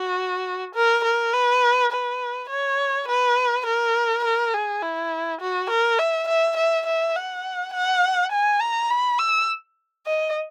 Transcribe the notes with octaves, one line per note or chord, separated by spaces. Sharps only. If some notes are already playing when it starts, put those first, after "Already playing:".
Already playing: F#4
A#4
A#4
B4
B4
C#5
B4
A#4
A#4
G#4
E4
F#4
A#4
E5
E5
E5
E5
F#5
F#5
G#5
A#5
B5
E6
D#5